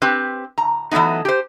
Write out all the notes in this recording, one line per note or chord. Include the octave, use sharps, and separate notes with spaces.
C4 G4 B4
A#5
E3 F#3 A3 B3 D#4
G4 C5